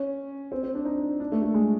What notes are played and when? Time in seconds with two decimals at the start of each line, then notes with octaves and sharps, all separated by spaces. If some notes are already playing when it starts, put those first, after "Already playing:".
Already playing: C#4
0.52 C4
0.63 C4
0.75 D4
0.85 D#4
1.20 D4
1.32 A3
1.42 A3
1.54 G#3